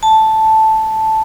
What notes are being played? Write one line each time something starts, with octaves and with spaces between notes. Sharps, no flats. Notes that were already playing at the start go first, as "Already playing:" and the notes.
A5